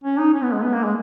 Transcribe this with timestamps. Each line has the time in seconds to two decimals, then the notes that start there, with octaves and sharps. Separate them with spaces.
0.04 C#4
0.19 D#4
0.34 C#4
0.43 B3
0.53 G#3
0.64 B3
0.73 A#3
0.84 G#3